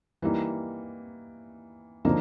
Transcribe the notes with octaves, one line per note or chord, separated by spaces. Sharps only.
E3 G3 A#3 D#4
D3 F3 A#3 D#4